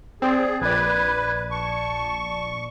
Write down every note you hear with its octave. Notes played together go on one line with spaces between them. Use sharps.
C4 G#4 D5
A#1 B4 D5 G#6
A5 C#6